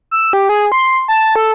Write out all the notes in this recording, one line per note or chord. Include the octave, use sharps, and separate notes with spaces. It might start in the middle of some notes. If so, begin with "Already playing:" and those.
E6
G4
G#4
C6
A5
A4